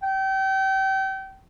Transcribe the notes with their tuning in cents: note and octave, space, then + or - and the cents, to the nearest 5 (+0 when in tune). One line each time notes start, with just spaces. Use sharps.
G5 -30